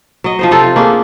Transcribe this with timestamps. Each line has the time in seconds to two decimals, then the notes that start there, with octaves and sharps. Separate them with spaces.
0.24 F#3 D#5
0.39 F3 D#4 C5
0.51 C3 D#4 F4 A4
0.76 A#3 C#4 D4 G#4